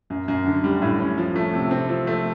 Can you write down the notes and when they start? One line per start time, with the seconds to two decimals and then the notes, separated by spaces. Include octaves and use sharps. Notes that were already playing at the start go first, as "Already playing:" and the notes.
0.10 F#2
0.28 F#2
0.46 D3
0.64 G3
0.82 A2
1.00 C#4
1.18 F3
1.36 A3
1.54 C3
1.71 C4
1.89 F3
2.07 A3